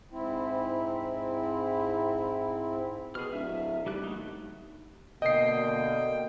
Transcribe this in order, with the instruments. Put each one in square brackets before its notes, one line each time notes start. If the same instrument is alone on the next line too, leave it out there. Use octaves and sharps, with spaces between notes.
[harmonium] G#2 C4 E4
[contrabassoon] B2 [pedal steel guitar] G#4 F6
[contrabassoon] D1 [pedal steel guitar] E5
[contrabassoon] D#2 [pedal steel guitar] G3 G4 F#6
[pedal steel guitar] F#3 A3 D#4
[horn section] B2 D3 A#3 [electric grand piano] D#5 C7 [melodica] G5